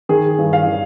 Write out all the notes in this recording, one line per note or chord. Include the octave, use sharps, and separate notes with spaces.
D#3 G#4
G2
F5
D#3